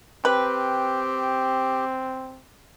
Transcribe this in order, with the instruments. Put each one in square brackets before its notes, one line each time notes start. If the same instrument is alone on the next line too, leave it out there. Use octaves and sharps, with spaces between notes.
[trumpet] C4 [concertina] G4 [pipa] B4